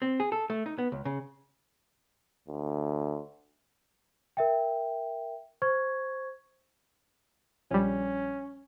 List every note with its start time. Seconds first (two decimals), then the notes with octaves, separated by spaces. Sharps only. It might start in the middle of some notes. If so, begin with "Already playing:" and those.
0.02 C4
0.20 G#4
0.32 A4
0.50 A3
0.66 D#4
0.78 B3
0.92 C#2
1.05 C#3
2.48 D2
4.37 A#4 E5 G5
5.62 C5 C#6 G#6
7.71 A#1 G3 C#4